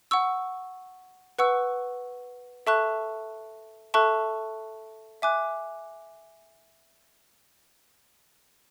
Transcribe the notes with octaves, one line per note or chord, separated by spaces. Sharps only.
F#5 C#6 E6
B4 F#5 C#6 E6
A4 E5 A5 C#6 F#6
A4 E5 A5 C#6 F#6
E5 G#5 D6 F#6